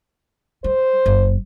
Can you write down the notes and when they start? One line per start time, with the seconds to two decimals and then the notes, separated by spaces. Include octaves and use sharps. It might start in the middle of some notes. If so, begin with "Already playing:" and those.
0.64 G3 C5
1.06 F#1